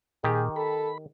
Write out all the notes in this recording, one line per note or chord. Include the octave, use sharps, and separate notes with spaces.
A#2 D#3 G4 G#4
A4 B5